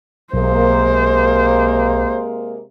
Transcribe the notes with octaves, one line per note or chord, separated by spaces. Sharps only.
B1 C3 G#3 A#3 C5